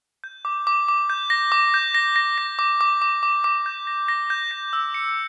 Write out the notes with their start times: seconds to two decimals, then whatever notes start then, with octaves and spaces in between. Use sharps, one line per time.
0.24 G6
0.45 D6
0.67 D6
0.89 D6
1.10 G6
1.30 A#6
1.52 D6
1.74 G6
1.95 A#6
2.16 A#6
2.38 A#6
2.59 D6
2.81 D6
3.02 D6
3.23 D6
3.44 D6
3.66 G6
3.87 A#6
4.08 A#6
4.30 G6
4.51 A#6
4.73 E6
4.94 C#7